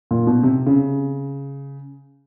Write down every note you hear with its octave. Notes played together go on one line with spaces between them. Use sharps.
A#2
B2
C3
C#3